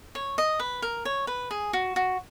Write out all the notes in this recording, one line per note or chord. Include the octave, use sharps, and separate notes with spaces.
C#5
D#5
B4
A#4
C#5
B4
G#4
F#4
F#4